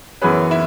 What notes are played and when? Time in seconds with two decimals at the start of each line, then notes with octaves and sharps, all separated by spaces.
0.21 F#2 E3 B3 C#4 G#4 B4
0.51 E4